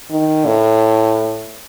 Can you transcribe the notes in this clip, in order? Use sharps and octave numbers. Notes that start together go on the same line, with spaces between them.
D#3
A2